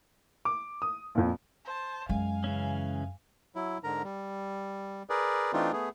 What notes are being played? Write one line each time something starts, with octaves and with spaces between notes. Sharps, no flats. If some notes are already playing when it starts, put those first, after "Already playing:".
D6
D#6
A#1 F2
C5 A5
F#2 G#3 F5 G#5
C#3 E3 C#4
F#3 E4
G#2 D3 A#4 A#5
G3
G#4 A#4 B4 D5
E3 A3 C4 D4 D#4 F4
A3 B3 G#4